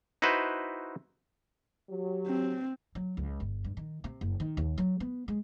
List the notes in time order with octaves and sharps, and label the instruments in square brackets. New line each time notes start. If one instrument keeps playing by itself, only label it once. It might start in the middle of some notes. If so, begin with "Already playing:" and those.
[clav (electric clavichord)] D#4 E4 F#4 B4 C5
[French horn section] F#3 G4
[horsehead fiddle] C4
[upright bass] F#3
C#2
G1
G2
D#3
C3
F#1
D#3
D#2
F#3
B3
G#3